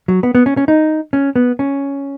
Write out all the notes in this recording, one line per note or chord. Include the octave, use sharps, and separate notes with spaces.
F#3
B3
B3
C#4
C#4
D#4
C#4
B3
C#4